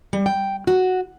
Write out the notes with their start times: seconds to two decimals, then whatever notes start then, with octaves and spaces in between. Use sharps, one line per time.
0.13 G3
0.26 G5
0.67 F#4